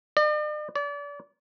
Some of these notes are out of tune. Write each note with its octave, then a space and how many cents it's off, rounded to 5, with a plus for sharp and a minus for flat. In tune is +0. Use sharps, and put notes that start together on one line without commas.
D5 +45
D5 -35